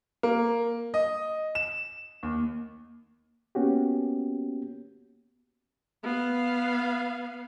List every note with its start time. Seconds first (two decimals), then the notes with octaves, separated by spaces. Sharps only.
0.23 A#3
0.94 D#5
1.55 E7
2.23 D#2
3.55 A#3 B3 C#4 F#4 G4
6.03 B3 F5